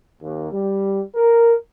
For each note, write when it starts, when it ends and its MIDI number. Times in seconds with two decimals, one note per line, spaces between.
0.22 0.49 39
0.52 1.01 55
1.16 1.53 70